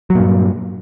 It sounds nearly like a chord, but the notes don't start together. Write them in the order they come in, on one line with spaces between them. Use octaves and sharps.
F#3 A#2 G2